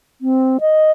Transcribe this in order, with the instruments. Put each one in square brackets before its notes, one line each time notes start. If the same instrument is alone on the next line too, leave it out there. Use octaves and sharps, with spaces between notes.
[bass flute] C4
D#5